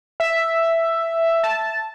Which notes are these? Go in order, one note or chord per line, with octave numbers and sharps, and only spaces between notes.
E5
A5